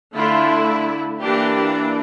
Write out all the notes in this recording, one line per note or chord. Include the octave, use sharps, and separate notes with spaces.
D3 A3 E4 F4
E3 A#3 D4 G4